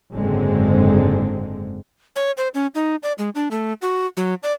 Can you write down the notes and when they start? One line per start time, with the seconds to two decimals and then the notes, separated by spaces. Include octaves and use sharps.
0.13 F#1 G#2 D3 G#3 C4
2.16 C#5
2.37 C5
2.54 C#4
2.75 D#4
3.03 D5
3.18 G#3
3.35 D4
3.51 A3
3.82 F#4
4.17 F#3
4.43 D5